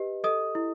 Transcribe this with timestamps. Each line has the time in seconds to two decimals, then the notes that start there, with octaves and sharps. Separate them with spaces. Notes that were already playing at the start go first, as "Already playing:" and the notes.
Already playing: G4 B4 D#5
0.24 A4 D#5 D#6
0.55 E4